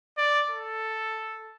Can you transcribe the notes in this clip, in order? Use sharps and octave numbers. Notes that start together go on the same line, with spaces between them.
D5
A4